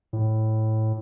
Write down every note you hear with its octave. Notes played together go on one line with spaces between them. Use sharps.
A2